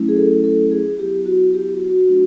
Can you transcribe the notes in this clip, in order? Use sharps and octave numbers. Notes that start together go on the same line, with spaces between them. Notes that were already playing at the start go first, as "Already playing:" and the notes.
Already playing: F#3 A3 C#4 E4
G#4
A4
A4
G#4
F#3 B3 E4 G4
F#4
G4
F#4
F#4
F#3 A3 D4 F4 F#4